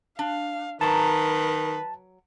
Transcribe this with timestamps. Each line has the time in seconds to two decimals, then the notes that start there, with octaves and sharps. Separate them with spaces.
0.19 D4 F5
0.81 D#3 F#3 B4 A5 A#5